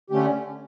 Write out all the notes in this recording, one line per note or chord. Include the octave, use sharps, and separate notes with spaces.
D3 A3 C#4 G4